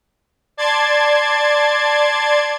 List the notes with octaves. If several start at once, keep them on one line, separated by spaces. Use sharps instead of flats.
D5 A5 C6 G#6 A6